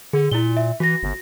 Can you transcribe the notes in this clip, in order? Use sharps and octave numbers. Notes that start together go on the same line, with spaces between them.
D3 G#4
A#2 E4 G7
E5
E3 F#4 A#6
G1